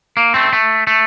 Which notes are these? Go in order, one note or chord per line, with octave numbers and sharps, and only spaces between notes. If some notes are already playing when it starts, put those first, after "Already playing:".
A#3
A3 C4
A3
A3